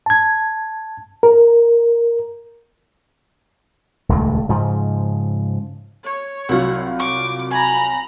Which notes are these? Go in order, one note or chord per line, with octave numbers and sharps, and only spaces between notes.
A5 G#6
A#4
D#1 C#2 G2 A3
G#2 C#3 F3
C#5
C2 F#3 E4 F4 F#5
C#6 D6
G#5 A#5 B5